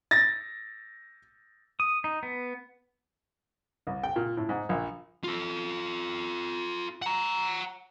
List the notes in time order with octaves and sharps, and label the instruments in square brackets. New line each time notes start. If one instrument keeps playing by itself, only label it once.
[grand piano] A6 A#6
[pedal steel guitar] D#6
D#4
B3
[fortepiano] C2
G5
A#2
A2
G#2
A#1
[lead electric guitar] F4 A4
F#5 A#5